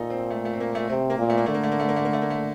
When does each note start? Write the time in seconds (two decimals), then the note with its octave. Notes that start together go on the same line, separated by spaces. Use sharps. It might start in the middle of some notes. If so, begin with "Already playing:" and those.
Already playing: A#2 D#4 A4
0.10 C4
0.31 A3
0.45 A3
0.54 C4
0.60 A#3
0.75 A3
0.89 C3 C4
1.10 A#3
1.19 A#2
1.30 A3
1.38 A#3
1.46 D3 A3
1.54 A#3
1.63 A3
1.71 A#3
1.80 A3
1.89 A#3
1.96 A3
2.05 A#3
2.13 A3
2.22 A#3
2.30 A3